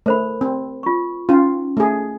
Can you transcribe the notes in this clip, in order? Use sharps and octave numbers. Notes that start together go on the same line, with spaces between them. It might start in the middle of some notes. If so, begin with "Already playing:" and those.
A3 A#4 C5 B5
C4
F4 C#6
C#4 D#4 F4
A3 G#4